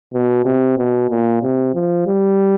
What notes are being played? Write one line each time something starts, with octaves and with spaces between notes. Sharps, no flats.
B2
C3
B2
A#2
C3
F3
G3